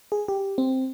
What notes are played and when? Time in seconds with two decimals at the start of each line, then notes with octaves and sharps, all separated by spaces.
0.12 G#4
0.28 G4
0.58 C4